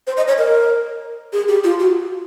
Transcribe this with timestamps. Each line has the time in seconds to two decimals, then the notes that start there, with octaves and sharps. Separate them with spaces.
0.07 C5
0.17 D#5
0.28 C#5
0.38 A#4
1.32 G#4
1.48 G4
1.64 F4
1.79 F#4